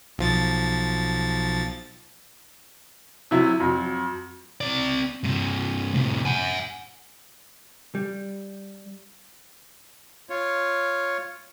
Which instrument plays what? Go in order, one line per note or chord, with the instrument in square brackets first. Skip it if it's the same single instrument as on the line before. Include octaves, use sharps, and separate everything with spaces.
[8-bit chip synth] B1 F3 A6
[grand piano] C3 F#3 E4
F2 F#3
[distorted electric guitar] C4 D5
G2 C3
A2 C3
F#5 G#5
[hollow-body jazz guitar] G3
[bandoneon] F4 C#5